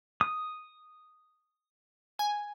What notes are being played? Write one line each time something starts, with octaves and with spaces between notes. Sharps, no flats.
D#6
G#5